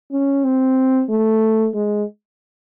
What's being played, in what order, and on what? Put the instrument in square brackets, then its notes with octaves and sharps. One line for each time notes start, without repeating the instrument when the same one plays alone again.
[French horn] C#4
C4
A3
G#3